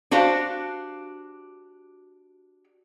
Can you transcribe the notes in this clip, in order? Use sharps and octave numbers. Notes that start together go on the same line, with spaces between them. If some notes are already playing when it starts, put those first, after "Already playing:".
D4 F#4 G4 C5 F5